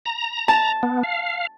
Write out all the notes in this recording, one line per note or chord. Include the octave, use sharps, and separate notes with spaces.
A#5
A5
B3
F5